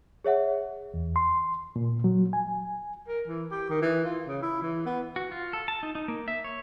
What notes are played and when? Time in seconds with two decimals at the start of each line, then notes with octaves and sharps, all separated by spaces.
0.24 G#4 C#5 E5 F#5
0.94 E2
1.16 C6
1.76 A#2
2.04 F#3
2.33 G#5
3.08 A#4
3.27 E3
3.52 G4
3.70 D#3
3.82 E3
4.04 F4
4.27 C#3
4.42 E4
4.62 E3
4.86 B3
5.16 F#4
5.32 F4
5.53 A4
5.68 A5
5.83 D#4
5.95 D#4
6.08 A#3
6.28 E5
6.44 C#5